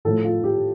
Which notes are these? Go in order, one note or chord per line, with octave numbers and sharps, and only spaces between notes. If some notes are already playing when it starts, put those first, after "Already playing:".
A2 F3 A3 A4
F4
G4